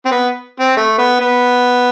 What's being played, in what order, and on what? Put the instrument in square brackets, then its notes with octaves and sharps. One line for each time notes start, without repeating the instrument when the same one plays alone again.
[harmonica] C4
B3
C4
A3
B3
B3